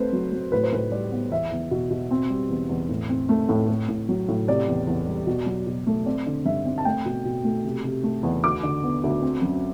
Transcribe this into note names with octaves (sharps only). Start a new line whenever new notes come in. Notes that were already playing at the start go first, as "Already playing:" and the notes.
Already playing: A3 C4 B4 C5
F#3
F#3
A2 B4
C5
A2 B4
G3 D5
B3
E2 E5
E2
B2
B2
C4
G3
E2
E2
A2
C4
A3
A2
A2
A2
F#3
A2
C3 D5
E2
E2
G3
B2
F#3
B2
A3
C4 D5
D3
G2 E5
C4
A5
A3 G5
B2
B2
A3
C3
C3
A3
E2
D2 D6
D3
B3
D2
C4
F#2